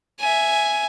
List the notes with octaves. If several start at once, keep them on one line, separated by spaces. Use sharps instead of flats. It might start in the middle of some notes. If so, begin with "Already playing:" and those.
E5 G#5